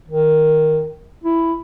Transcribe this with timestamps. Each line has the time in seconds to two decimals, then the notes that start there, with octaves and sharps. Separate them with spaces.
0.08 D#3
1.24 E4